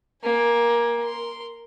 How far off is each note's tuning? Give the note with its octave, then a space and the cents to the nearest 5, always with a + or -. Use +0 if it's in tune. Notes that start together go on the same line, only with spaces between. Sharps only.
A#3 +15 G#5 -15
A#4 +0 C6 +0